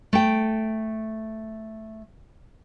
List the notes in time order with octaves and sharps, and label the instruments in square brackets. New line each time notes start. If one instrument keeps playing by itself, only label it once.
[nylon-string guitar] A3 G5